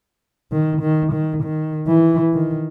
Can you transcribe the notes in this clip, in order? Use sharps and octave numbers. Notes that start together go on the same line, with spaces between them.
D#3
D#3
D#3
D#3
E3
D#3